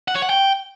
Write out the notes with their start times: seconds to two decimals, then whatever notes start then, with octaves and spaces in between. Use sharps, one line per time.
0.08 F#5
0.15 C#5
0.22 F#5
0.29 G5